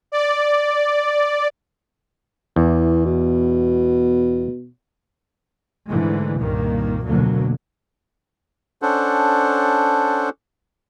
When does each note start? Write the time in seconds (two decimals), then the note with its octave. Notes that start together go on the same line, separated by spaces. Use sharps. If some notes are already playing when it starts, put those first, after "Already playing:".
0.12 D5
2.56 E2 E3
3.05 B2
5.88 G#2 D3 E3 G#3 A3
6.39 C2 G2 A#2 D#3 A#3
7.05 F1 D2 B2 D3 F#3 A#3
8.82 C#4 D4 A4 C5 F#5